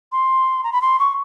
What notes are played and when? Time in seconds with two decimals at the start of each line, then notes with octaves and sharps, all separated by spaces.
0.12 C6
0.64 A#5
0.72 B5
0.81 C6
0.99 C#6